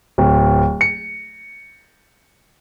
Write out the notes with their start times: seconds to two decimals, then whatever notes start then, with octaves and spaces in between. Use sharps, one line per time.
0.18 D1
0.81 C#7